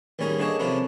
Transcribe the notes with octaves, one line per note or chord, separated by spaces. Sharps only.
A1 D#2 G3 C#4 G#4 A#4
D3 A#3 D4 G#4 C#5 D#5
C3 F3 C#4 D4 E4 A#4